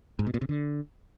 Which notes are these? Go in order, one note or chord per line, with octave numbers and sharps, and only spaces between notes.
G#2
B2
A#2
C3
D3